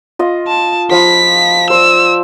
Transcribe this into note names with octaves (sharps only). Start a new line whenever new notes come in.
F4 D#5
A5
F3 F5 B5 B6
C5 D5 E6